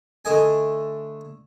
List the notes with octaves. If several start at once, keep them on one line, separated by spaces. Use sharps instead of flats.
D3 A3 D#5 G#5